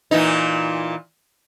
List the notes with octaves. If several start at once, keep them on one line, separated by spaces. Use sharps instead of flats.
A#2 E3 D#4